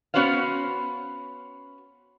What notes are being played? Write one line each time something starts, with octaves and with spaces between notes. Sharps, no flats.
B3 C#4 F#4 B4 C5 F5